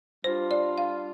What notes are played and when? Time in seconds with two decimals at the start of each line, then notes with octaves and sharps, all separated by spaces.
0.24 G3 D4 F4 C5
0.51 D5
0.78 F5